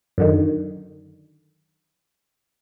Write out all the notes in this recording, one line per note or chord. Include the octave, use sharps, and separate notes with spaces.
F#2 D3 D#3